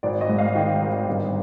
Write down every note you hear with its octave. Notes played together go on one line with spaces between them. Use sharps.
G#1 D5
D#5
G#2
F5
D#3 G5
G#1
G1